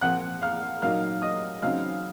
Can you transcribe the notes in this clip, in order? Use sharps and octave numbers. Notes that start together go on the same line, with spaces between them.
A#2 F3 C4 F#5 F#6
F5 F6
A#2 F#3 A#3 D#4 F5 F6
D#5 D#6
C#3 F#3 C4 D#4 F5 F6